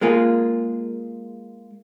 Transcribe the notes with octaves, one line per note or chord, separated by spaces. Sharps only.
G#3 A#3 F4 G#4